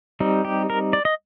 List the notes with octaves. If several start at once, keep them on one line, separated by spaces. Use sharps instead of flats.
G3 C4 D#4
G4
A#4
D5
D#5